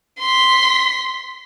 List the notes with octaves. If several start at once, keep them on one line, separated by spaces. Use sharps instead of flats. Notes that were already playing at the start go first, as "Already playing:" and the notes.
C6 B6